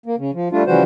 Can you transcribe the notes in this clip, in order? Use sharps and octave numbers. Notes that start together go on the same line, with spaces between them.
A#3
C#3
F3
G3 A3 D4 F4
C#3 E3 F3 G3 F#4 C5